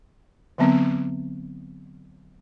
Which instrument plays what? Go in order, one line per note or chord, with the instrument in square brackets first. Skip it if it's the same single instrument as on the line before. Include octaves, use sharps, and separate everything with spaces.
[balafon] D3 F#3 B3 C4